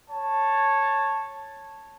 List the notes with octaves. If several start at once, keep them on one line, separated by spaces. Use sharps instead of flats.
C#5 A5